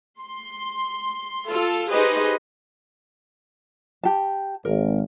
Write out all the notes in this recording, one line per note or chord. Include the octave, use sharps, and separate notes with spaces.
C6
F4 A4
D#4 G4 G#4 B4 C5 D#5
G4 A5
G#1 A#4